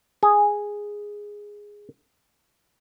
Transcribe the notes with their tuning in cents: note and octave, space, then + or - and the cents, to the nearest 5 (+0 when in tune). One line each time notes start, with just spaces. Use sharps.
G#4 -5